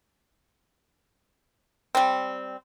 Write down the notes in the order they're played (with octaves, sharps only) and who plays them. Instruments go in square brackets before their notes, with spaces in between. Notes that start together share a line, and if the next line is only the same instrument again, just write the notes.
[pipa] G3 C4